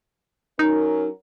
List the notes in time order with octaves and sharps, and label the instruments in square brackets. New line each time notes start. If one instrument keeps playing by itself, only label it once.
[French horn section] F#3 C#4 A#4 [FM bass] D#4